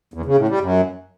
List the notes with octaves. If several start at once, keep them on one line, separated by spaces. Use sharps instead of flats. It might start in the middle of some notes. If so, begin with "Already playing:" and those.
E2
C#3
A2
G3
F#2